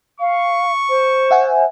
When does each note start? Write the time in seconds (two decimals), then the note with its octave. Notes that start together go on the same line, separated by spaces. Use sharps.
0.20 F5 C#6
0.89 C5
1.31 E5 F#5 G#5